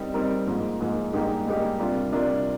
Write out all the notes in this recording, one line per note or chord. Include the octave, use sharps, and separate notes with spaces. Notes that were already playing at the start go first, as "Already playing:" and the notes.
Already playing: G3 C4 D#4 A#4
G3 C4 D#4 A#4
G#2 F3 A#3
G#2 F3 A#3
G#2 G3 A#3 D#4 G4
G#2 G3 A#3 D#4 G4
C3 G3 D4 F4 A#4
C3 G3 D4 F4 A#4